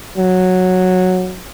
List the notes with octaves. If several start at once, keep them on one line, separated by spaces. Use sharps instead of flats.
F#3